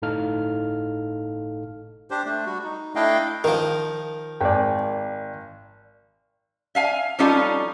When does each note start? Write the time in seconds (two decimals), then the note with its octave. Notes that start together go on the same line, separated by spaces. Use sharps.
0.02 G1 A2 D#4 A4 F5 F6
2.11 D4 G4 C5
2.25 A3 D4
2.46 G3 F#4
2.64 D#4
2.95 A3 D4 E4 D#5 F5 G5
3.44 D#3 F3 A#4
4.41 G#1 D5 G5 G#5
6.75 E5 F5 G#5
7.19 F3 G3 C#4 D#4 F4 A4